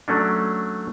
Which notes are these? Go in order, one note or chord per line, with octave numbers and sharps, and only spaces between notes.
F#3 A3 C#4 D4